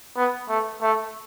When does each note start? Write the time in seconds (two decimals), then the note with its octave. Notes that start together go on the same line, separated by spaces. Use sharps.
0.16 B3
0.49 A3
0.82 A3